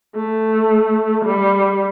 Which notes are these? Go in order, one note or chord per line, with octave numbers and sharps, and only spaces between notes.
A3
G3